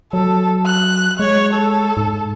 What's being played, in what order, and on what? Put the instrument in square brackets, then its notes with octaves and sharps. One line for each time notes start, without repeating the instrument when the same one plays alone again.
[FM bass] F#3 [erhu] A4
[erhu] F#6
[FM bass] G#3 [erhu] C#5
[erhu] A4
[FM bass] G#2